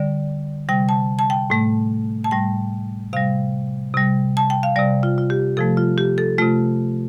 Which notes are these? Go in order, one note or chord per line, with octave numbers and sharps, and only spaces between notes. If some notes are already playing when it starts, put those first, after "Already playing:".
Already playing: D3 G3 D5
C3 G3 G5
A5
A5
G5
A2 A3
A5
A2 G3 G5
C3 G3 F5
C3 G3
A5
G5
F5
C3 G3 D5
F4
F4
G4
C3 F3 A3 A4
F4
G4
A4
C3 A3 F4